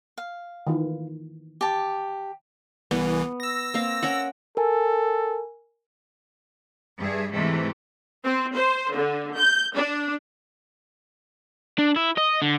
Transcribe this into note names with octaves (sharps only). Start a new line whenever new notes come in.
F5
D#3 E3 F4
G4 A5
C2 E3 B3
E6 A#6
A#3 C4 F5
C#4 A#4 F#5
A4 A#4 G#5
G2 G#4 E5
G#2 C3 E3 A3
C4
C5
D3
G6
D4
D4
E4
D#5
D3